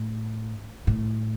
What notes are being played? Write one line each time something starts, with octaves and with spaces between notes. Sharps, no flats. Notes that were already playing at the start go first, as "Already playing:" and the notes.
Already playing: A2
A2